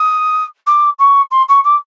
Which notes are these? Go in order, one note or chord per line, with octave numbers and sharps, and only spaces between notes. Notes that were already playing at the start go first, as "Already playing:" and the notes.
Already playing: D#6
D6
C#6
C6
C#6
D6